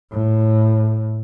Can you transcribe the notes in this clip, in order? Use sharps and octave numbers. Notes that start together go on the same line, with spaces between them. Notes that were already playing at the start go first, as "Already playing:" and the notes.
A2